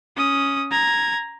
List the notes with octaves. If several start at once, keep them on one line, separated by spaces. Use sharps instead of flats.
C#4 D#6
A#5 G#6